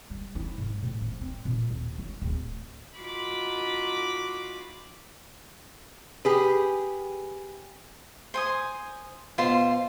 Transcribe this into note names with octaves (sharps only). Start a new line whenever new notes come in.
G3
E4
G#2
A2
F3
C4
A#2
D#2
F#3
D1
D#4 F4 F#4 B5 D6
G4 G#4 B4
C5 G#5 D#6
B2 F4 C5 C6